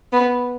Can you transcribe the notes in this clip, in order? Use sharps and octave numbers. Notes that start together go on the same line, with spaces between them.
B3